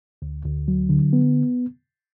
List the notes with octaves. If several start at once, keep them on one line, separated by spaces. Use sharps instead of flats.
D2
D2
F#3
D3
B3